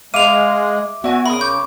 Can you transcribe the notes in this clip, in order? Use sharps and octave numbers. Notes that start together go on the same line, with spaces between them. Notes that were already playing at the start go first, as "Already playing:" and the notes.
G#3 E5 F5 D6 D#7 F7
B3 E4 F#4 D5 G#5
C#3 A#4 B5 C6 D#6
C#6 D6 G6